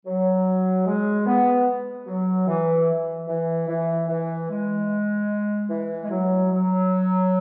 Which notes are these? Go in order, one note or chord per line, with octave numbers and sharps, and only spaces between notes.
F#3
G#3
B3
F#3
E3
E3
E3
E3
G#3
E3
G#3
F#3
F#3